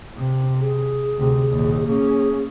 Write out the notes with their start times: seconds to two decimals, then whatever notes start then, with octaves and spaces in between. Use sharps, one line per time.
0.16 C3
0.61 G#4
1.17 D2 C3
1.48 A#1 D#2
1.87 A#3 C#4 G#4